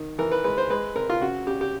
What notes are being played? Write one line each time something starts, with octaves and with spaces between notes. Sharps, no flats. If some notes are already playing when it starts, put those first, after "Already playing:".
Already playing: D#3
E3 A#4
B4
G#3 B4
C5
G#3 B4
C4 A#4
F4
C#3 F#4
C#3 G4
G4